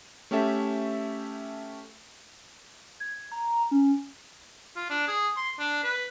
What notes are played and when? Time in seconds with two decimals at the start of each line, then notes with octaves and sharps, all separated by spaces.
0.31 A3 C#4 G4 A4 E5
3.00 G#6
3.32 A#5
3.71 C#4
4.76 F4
4.90 D4
5.07 G#4
5.37 C6
5.59 D4
5.84 B4